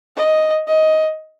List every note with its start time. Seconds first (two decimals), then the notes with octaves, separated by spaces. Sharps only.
0.17 D#5
0.68 D#5